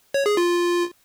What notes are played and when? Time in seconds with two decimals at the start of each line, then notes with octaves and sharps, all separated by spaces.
0.14 C#5
0.26 G#4
0.37 F4